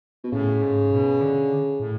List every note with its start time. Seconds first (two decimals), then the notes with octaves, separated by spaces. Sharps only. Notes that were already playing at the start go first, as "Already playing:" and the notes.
0.24 B2
0.32 A2 C#3
0.62 G#2
0.91 B2
1.21 D3
1.80 A2